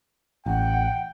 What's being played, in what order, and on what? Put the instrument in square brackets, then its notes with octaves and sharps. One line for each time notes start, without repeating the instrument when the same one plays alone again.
[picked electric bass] A1 [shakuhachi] F#5 [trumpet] G5